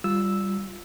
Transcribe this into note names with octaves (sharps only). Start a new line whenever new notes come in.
G3 F4 E6